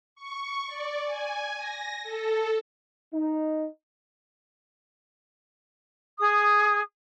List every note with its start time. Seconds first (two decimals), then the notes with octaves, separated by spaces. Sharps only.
0.15 C#6
0.67 D5
1.05 G#5
1.57 A#6
2.03 A4
3.14 D#4
6.19 G#4 D#6